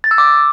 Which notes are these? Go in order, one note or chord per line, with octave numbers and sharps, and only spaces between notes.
A6
E6
D6